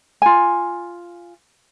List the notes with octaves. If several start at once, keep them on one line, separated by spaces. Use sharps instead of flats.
F4 G#5